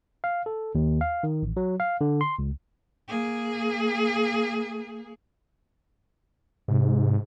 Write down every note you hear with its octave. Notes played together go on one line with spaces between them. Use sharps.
F5
A4
D#2
F5
D#3
A1
F#3
F5
D3
C6
C#2
A#3 G#4
G#2 C3